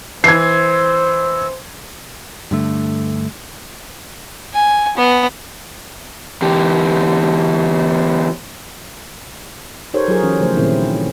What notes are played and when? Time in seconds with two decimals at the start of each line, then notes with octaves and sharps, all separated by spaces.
0.24 E3 C5 E6 G#6 C7
2.51 G2 D3 A3
4.54 G#5
4.97 B3
6.42 E2 G4
9.94 D#4 G4 A4 A#4 C5 C#5
10.08 F#3 F4 G#4 A#4
10.23 E3 C#4
10.40 C#3 F3 A3 C5
10.57 A#2 D#3 C4 C#4 E4